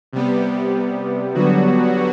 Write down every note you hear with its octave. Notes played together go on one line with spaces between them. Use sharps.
C3 G3 B3
D3 F#3 G3 B3 F#4